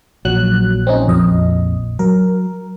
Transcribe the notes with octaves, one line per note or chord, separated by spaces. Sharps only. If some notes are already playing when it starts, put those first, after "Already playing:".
A#1 F#3 F#6
C4 C#4 D#4
F2 D#5
F#3 A#4